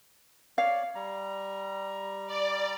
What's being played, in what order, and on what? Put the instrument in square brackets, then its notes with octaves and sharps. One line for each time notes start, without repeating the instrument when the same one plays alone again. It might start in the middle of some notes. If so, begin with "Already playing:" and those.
[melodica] C#5 D5 [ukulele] F5
[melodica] G3 A#5
[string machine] D5